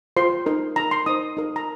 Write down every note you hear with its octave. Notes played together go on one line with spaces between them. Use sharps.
F4 C5 C6
D#4 A#4
D#4 A#4 A#5
C6
D#4 C5 D#6
D#4 A#4
A#5